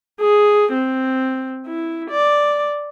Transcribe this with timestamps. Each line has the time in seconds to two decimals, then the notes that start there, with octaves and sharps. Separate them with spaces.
0.20 G#4
0.73 C4
1.66 E4
2.10 D5